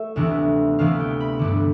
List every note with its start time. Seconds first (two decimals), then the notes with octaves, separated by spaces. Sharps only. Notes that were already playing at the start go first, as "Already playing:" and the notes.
Already playing: A3 E5
0.16 D2 C3 E3 B3 D4
0.79 D2 C3 E3 B3 D4 F5
1.00 G5
1.20 B5
1.39 G2 D3 G3 D4